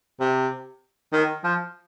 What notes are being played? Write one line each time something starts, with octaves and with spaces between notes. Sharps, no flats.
C3
D#3
F3